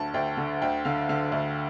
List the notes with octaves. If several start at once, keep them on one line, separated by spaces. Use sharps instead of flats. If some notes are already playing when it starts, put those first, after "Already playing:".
Already playing: D2 D3 A5
D2 G5
D3
D2 G5
D3 F5
D3 F5
D2